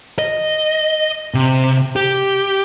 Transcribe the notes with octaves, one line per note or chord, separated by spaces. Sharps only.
D#5
C3
G4